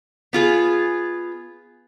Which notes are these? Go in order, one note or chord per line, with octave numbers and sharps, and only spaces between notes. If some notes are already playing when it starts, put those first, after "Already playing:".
B3 F4 G#4